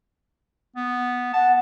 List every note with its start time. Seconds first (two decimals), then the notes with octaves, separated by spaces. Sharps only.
0.76 B3
1.33 F#5 A5